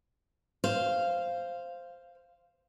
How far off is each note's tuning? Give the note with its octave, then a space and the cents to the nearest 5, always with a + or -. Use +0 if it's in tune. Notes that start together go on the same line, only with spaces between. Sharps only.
C5 +0 F5 -10